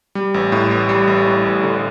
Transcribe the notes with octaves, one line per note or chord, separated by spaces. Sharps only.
G3
A1
A2
A1
G3
A1
A2
A1
D3